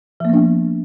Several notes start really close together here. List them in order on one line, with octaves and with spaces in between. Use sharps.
F3 A#3 B3 D4